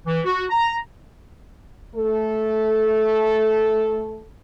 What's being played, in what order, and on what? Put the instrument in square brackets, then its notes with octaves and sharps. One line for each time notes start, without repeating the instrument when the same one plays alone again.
[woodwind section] E3
F#4
A#5
[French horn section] A3 A4